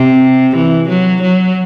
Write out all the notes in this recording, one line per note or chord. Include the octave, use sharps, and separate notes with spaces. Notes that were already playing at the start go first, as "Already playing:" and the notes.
Already playing: C3
E3
F#3
F#3